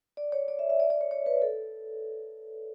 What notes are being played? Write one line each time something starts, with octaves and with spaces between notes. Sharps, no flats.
D5
C#5
D5
E5
E5
D5
D5
C#5
C#5
B4
A4